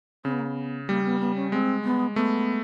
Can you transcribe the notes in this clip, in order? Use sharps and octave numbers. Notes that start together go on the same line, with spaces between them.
C#3 C4
B3
A#3
B3
G3 A#3
B3
B3
C#4
G#3 C4
B3
A3 B3